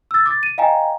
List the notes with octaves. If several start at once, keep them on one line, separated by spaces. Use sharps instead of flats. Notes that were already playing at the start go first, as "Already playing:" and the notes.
E6 A6
D6 A6
D#7
D#5 F5 G5 G#5 A#5